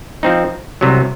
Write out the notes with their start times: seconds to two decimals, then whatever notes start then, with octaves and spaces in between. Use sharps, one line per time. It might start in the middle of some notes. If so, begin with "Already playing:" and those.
0.23 F3 C4 D#4
0.81 C2 C3 F#3